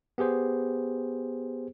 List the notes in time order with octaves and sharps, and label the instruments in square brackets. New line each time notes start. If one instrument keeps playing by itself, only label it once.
[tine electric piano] B3 G4 G#4 C5